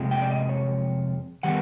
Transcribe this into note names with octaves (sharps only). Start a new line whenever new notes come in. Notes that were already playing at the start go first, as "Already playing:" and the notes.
Already playing: F2 C3 F3 G#3
G5
D5
D#5
C#5
D#3 G3 B3 F#5